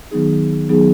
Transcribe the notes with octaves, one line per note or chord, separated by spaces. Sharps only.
D#3 F#3 B3 D#4 G#4
D#3 F#3 B3 D#4 G#4